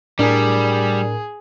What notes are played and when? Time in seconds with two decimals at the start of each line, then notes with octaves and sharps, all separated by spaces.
0.19 A2 G3 D4 G#4 A#4